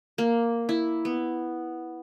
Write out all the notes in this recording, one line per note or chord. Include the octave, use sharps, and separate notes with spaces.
A#3
E4
B3